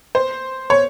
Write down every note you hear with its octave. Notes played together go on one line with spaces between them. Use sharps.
C5
C#5